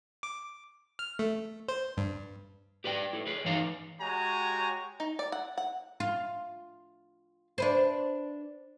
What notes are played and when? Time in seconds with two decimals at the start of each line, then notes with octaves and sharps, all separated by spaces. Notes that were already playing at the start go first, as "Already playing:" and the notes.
0.23 D6
0.99 F6
1.19 A3
1.68 C5
1.97 G2
2.84 G4 B4 D5 G5
3.13 E4 A4
3.26 G#4 B4 C#5
3.45 G2 E3 D#4 F5 A#5
4.01 G#3 F#4 G4 C#5 G#5 A#5
5.00 D#4
5.19 D5
5.32 F#5
5.58 F#5
6.00 F4
7.58 D4 B4 C5